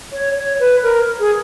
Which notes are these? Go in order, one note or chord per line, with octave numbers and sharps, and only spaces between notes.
C#5
C#5
B4
A#4
G#4